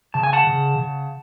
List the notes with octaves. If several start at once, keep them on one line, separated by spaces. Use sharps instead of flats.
C#3 A5
G#5
F#5 A5
C#3
C#3